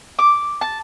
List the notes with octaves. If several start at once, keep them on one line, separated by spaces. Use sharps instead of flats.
D6
A5